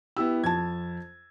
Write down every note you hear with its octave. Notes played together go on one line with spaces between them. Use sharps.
B3 E4 G4 E6
F2 A5 G#6